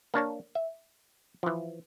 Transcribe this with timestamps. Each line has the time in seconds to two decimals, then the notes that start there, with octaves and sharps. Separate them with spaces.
0.14 A#3 D4 C#5 A5
0.55 E5
1.43 E3 F3